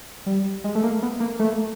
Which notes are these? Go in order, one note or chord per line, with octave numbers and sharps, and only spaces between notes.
G3
G#3
A3
A#3
B3
A#3
A3